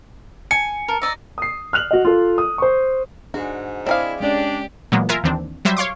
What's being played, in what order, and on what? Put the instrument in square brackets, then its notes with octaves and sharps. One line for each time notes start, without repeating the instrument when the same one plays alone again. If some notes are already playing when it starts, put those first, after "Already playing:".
[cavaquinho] G#5 [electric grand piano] C#7
[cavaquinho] A#4 [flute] A5
[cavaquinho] D#4 D5 D#5 [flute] E6
[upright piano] D#6 C7
F6 F#6 F7 F#7
F#4 D#5
F4 A4
D#6
C5 C#6
[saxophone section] G#2 [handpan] D4 G#4 [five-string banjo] F#4
[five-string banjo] C4 G#4 F5 [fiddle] E4 [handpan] D5 D#5
[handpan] G#3 C#4 D5 [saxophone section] D4 [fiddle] G4
[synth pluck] A#2 E3 F#3 G#3 A#3 B3
F4 A#4 E5 F5 G#5
D#2 D#3 E3 C4 D4
F#3 G3 C5 E5
C#5 F5 C6 D6